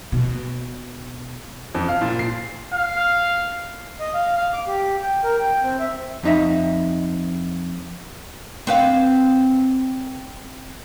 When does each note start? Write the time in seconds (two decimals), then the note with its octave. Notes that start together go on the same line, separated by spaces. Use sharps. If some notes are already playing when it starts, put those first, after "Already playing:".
0.12 B2
1.75 F2
1.88 F5
2.01 A#2
2.19 C7
2.74 F5
4.00 D#5
4.14 F5
4.36 F5
4.53 D6
4.67 G4
5.02 G5
5.23 A#4
5.39 G5
5.63 C4
5.80 E5
6.23 F2 D#4 E5
8.67 C4 B4 F5